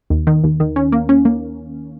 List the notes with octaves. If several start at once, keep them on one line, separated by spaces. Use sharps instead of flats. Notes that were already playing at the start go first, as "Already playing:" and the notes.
D#2
D#3
D#2
D#3
C#4
A#3
C#4
A#3